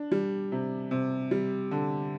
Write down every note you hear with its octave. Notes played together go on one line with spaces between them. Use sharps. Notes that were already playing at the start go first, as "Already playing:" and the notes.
Already playing: D4
G3
C3
C3
G3
D3